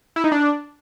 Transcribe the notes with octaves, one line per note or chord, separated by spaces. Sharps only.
E4
D#4
D4